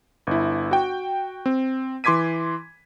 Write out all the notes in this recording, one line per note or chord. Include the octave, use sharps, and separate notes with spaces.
G1 E4
F#4 G5
C4
E3 C6 D6 G#6 B6 D#7